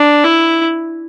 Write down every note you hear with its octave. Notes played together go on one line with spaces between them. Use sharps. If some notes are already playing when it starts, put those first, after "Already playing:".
Already playing: D4
E4